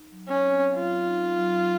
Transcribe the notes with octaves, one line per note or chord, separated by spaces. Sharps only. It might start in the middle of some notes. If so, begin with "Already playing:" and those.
Already playing: D#4
F#3
C#4
C4
F#3 F4
D#4
F#3